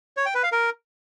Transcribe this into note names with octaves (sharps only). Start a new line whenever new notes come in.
C#5
G5
B4
F5
A#4